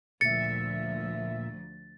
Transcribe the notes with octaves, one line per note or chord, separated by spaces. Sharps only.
D2 A#2 F3 E5 A6 C#7